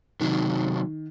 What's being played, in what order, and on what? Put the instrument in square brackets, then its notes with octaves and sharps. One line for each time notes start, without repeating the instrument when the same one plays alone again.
[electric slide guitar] C3 F#3 A3 [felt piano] D#3